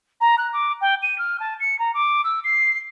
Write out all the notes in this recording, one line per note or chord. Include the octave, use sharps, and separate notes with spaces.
A#5
F#6
D6
G5
D#7
F6
A5
C#7
A#5
D6
E6
C7